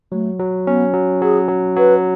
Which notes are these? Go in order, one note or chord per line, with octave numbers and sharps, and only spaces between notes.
F#3 A3
F#3
B3 C#4
F#3
F#3 G#4
F#3
F#3 B4